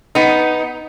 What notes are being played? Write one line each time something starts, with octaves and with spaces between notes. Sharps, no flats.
B3 D#4